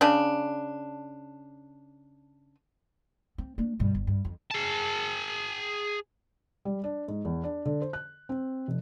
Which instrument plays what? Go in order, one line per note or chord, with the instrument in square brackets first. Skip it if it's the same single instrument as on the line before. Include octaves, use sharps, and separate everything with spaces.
[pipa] C#3 D4
[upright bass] C4
A#3 D4
G2 B2
G1
G2
F2
[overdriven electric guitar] G#4 A5
[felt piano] G3
D4
G#2
E2
D4
D3
C5
F#6
C4
F1